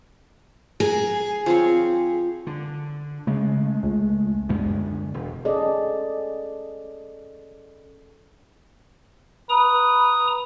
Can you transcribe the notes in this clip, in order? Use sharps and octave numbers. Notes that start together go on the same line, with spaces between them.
G#4 A#5
F3 C4 C#5
D3
C#3 G#3 A3
C#2
F#2 D3 G#3 B3
E1
C#4 G#4 A4 D5 D#5
B4 A#5 D#6